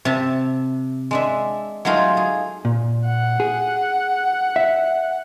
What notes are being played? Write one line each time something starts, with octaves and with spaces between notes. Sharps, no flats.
C3 E5 A5
G#3 D4 E5
F#3 G#3 A3 D#4 F4 G#4
G#4
A#2
F#5
G#4
E5